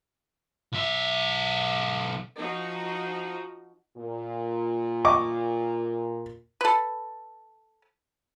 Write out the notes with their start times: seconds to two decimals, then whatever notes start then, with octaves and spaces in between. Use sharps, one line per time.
0.72 B1 E5
2.37 F3 D#4 F#4
3.96 A#2
5.05 D#5 C#6 D6
6.61 A4 B4